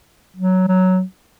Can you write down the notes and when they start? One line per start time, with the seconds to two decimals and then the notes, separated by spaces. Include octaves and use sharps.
0.36 F#3
0.68 F#3